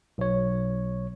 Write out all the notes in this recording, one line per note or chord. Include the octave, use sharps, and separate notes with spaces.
B1 C#5